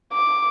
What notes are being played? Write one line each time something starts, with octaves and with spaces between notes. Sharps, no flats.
D6